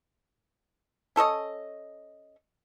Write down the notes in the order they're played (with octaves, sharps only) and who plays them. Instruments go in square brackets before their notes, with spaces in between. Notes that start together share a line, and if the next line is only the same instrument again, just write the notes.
[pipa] C#4 A4 C#5 D#5